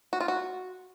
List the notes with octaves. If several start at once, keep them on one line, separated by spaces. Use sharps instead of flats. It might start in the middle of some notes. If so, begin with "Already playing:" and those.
F#4
F4
F#4